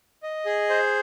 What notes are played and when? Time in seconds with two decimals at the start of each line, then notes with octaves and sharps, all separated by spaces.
0.23 D#5
0.46 G#4
0.69 C5